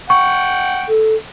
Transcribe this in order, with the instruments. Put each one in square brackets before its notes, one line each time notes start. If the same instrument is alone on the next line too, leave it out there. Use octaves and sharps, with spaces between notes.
[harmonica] F#5 G5 [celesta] C#6
[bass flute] A4